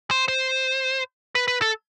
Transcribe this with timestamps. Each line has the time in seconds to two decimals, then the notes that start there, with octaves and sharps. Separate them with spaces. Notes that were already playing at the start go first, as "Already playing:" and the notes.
0.11 C5
0.28 C5
1.35 B4
1.48 B4
1.62 A4